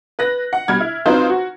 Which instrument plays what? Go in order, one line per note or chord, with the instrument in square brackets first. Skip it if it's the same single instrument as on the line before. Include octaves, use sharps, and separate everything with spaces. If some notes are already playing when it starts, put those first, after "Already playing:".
[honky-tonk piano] B4 F#6 A#6
F#5
B2 G3 F6 G#6
E4
F#3 C4 D#4 F4 B4 C5
F#4